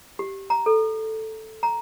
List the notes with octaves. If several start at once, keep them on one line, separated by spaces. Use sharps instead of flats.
G4
A#5
A4
A#5